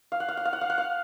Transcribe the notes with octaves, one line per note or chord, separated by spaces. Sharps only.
F5
F#5
F5
F#5
F5
F#5
F5
F#5
F5